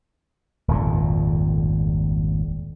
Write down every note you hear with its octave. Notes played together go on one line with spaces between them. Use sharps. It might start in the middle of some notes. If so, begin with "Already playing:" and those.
D#1 G#1 F2 A#2